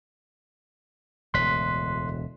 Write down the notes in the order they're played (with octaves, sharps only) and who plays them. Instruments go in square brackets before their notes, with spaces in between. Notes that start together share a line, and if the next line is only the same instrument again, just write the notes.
[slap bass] E1 D2 A2 [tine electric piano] C6 F#6 B6